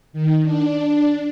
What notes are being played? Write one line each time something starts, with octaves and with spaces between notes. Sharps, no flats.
D#3
D4